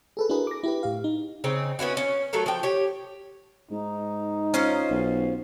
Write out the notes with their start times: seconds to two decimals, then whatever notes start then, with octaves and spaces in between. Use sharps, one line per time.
0.17 G#4 A4 B4
0.29 D4 E4 F#4 G#4 A#4 B4
0.47 D6 A#6
0.63 E4 G4 B4
0.83 A2 G4 F5
1.04 D#4
1.44 C#3 C4 D#4
1.79 B3 C#4 E4 F#4
1.97 C#4
2.33 F#3 A3 A4 A#4
2.46 F3 G5
2.63 G4 C#5
3.71 G#2 D#4
4.54 C#4 F4 C5
4.90 B1